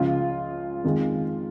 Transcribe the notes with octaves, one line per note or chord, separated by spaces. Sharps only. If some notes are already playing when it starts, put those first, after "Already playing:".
Already playing: C#2 C#3 F3 F4
F2 D#3 G#3